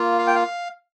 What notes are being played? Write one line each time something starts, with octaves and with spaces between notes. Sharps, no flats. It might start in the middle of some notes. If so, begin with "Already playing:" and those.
Already playing: A#3 F4
F5
G5
F5